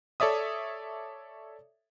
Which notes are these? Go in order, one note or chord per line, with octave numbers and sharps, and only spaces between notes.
A4 C#5 D5 E5 D#6